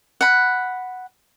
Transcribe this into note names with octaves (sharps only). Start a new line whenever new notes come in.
F#5 B5